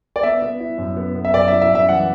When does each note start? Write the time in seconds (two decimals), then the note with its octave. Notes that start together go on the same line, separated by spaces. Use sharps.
0.16 D5
0.23 B3 E5
0.42 B3
0.60 E4
0.78 F#2
0.97 B3
1.15 B3
1.25 E5
1.34 F#2 D5
1.48 E5
1.52 E4
1.62 E5
1.70 F#2
1.75 E5
1.89 E3 F#5